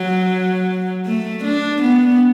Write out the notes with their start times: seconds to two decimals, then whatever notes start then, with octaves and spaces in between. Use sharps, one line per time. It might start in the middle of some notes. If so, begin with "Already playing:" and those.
Already playing: F#3
1.06 A3
1.44 D4
1.82 B3